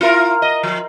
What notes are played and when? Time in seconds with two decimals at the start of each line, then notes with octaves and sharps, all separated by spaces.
0.01 E4 F4 A#4
0.42 D#5
0.63 F3